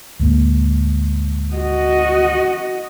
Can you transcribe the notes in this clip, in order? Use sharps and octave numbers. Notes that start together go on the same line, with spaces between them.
D2 G#2 A#3
F#4 D#5